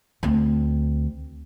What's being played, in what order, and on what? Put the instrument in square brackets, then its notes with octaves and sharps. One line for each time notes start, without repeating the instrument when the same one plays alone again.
[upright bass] D2 C4